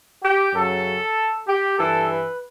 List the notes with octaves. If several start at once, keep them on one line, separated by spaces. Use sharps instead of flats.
G4
F#2 C#3 F#3 A4
G4
G2 E3 A4
B4